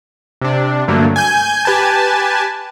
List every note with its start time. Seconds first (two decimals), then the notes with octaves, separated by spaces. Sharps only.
0.41 C3 D4
0.88 G2 D3 F#3 A3 A#3
1.16 G#5 G6
1.65 G4 B4 G#5 A5